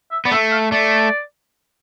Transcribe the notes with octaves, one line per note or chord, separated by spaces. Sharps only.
E5
B3 D5
A3 E5
F5
A3 D5